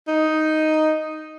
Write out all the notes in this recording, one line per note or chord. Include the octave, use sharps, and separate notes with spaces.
D#4